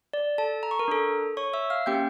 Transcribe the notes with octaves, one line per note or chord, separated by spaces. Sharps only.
D5
A4 A5
A#5
C#6
A#4 A#5
D4 A4
C#5 C#6
E5 E6
F5 F6
A#3 C#4 G4 G5 G6